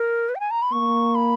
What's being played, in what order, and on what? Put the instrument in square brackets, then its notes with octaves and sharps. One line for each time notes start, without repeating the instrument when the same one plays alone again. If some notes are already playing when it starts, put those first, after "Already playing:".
Already playing: [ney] A#4
B4
G5
G#5
A#5
B5
[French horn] A#3 [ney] C#6
[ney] B5